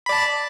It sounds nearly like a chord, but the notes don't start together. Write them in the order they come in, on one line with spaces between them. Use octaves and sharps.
B5 D5 A5